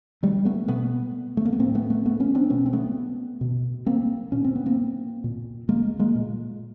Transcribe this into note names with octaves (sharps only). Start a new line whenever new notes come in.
G3 A3
A3 B3
B2 A3 B3
A3
A#3
B3
A2 A#3 C4
A3 B3
A3 B3
A3 B3
B3 C#4
C4 D4
B2 B3 C#4
C4
A3 B3
B2
A#3 C4
A#2 C#4
C4
B3
A#3 C4
A#2
G#3 A#3
G#3 A#3
A#2